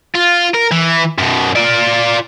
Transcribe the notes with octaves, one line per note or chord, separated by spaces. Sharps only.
F4
A#4
E3
F#2 B2
F4 D5